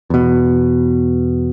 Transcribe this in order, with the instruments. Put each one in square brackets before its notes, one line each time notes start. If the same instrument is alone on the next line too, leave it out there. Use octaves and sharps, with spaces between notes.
[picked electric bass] E2 B2